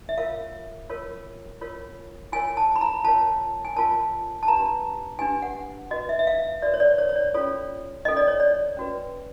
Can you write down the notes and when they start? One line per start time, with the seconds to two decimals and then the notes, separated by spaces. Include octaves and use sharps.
0.09 E5
0.18 F4 A#4 C#5 F5
0.89 F4 A#4 C#5
1.61 F4 A#4 C#5
2.32 F4 A#4 C#5 G#5
2.57 A5
2.76 B5
2.81 A#5
3.04 F4 A#4 C#5 A5
3.65 G#5
3.76 F4 A#4 C#5 A5
4.43 A5
4.48 D4 G4 B4 A#5
5.19 D4 G4 B4 G#5
5.42 F#5
5.91 F#4 B4 D#5
6.09 E5
6.19 E5
6.27 F5
6.62 F#4 B4 D5
6.74 C#5
6.80 D5
6.98 C#5
7.09 C#5
7.16 D5
7.34 C#4 F4 A4 C#5
8.05 C#4 F4 A4 D#5
8.17 D5
8.28 C#5
8.40 D5
8.77 C#4 F#4 B4